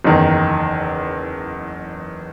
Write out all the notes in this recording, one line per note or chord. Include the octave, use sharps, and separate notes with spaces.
F#1 E2 D#3